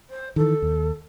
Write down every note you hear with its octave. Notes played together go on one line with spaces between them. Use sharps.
C5
D#3 E3 A4
D#2